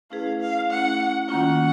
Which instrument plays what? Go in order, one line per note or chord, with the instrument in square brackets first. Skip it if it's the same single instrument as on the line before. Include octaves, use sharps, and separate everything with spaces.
[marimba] A3 C#4 E4 G#4 B4 [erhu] F5
[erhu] F5
[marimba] A3 C#4 E4 [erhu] F#5
[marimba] D#3 G3 A#3 C#4 F4 [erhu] F#5